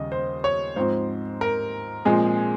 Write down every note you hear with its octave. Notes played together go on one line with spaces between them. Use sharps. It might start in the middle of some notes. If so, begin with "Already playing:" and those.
Already playing: D#2 C#3 G3 D#5
C5
C#5
G#2 F3 C4 C5
A#4
A#2 F3 G#3 C4 G#4